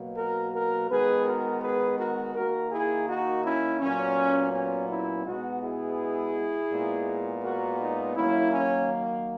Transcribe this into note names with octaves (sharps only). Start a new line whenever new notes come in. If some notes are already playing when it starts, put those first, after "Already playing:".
Already playing: B2 F#3 A#3
F#4 A#4
F#4 A#4
D#3 G#3 B3 G#4 B4
F#4 A#4
G#4 B4
F#4 A#4
D#3 A#3 F#4 A#4
E4 G#4
D#4 F#4
C#4 E4
A#2 F#3 B3 C#4
C#4
C#4 E4
B2 G#3 B3 D#4 F#4
E4 G#4
A#2 G#3 B3
F#4 A#4
D#4
D#3 F#3 A#3 C#4 E4
C#4